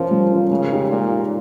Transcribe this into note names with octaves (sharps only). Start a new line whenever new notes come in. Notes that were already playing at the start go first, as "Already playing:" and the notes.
Already playing: F3 C#4 F4 A#4
G3
C#4 F4 A#4
C#3 G#3
D#4 G4
A#2 G#3
D#4 G4